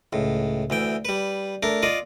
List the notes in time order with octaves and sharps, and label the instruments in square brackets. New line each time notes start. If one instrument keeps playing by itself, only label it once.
[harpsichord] C#2 A2
D2 E3 G5
G3 B4
A3 D4 A#4
F4 D5 D#5